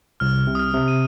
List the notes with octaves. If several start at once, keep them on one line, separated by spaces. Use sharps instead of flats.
C2 F6
C3
D#6
F6
C3
D#7